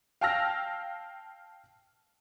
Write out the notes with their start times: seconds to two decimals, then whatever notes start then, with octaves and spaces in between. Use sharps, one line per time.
0.21 F5 G5 A5 E6 F6 A#6